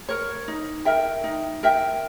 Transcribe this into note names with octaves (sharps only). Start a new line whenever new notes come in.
A#4 C#5
D#4
A#4 E5 G5
D#4
A#4 E5 G5